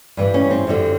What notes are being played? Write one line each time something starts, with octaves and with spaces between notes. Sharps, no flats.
G2 E3 G3
C#4
C4
F#2 D3 G3